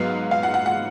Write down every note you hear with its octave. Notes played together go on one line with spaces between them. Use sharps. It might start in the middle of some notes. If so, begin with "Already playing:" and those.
Already playing: G#2 F#3 B3 F5
F5
F#5
F#5
F#5